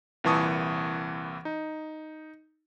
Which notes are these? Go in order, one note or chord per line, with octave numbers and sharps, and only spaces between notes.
C2 A#2 E3 A5 C#6 D#6
D#4